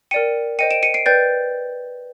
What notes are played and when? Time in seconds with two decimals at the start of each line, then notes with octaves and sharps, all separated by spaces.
0.11 A#4 D5 G5 C#7 D#7
0.59 C5 D#5 G5 C#7 D#7
0.71 D7 E7
0.83 C#7 D#7
0.94 C7 D7
1.06 B4 D5 G5 G6 A6